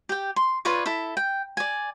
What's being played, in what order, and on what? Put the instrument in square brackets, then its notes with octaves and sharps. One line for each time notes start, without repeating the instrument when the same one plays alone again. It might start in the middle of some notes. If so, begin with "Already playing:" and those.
[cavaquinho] G4 G5
C6
F4 B4 C#5 D5
E4 A4 E5
G5
D5 G#5